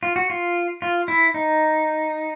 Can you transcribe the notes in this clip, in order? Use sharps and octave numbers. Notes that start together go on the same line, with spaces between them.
F4
F#4
F4
F4
E4
D#4